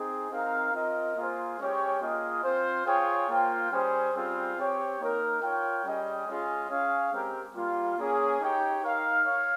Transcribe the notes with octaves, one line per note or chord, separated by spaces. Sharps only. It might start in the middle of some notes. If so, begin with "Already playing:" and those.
Already playing: C4 D#4 G#4
C4 D#4 A#4 F5
C4 F4 A#4 D#5
A#3 F4 G#4 C5
G#3 C#4 G4 C#5 G5
A#3 F4 G#4 D#5
C4 F4 C5
F4 G#4 C#5 G5
A#3 F4 C5 G5
G3 C#4 G#4 C5
G3 C4 F4 G#4 C5
C4 G4 C#5 G5
A#3 D#4 A#4
F4 A#4 C#5 G5
G3 C#4 G#4 D#5 G5
G#3 C#4 F4 G#4 D#5
C#4 G#4 C#5 F5
G#3 C4 G4 A#4
G3 A#3 F4
A#3 C#4 G#4 C#5
D#4 G4 C#5 G5
D#4 A#4 F5
C#5 F5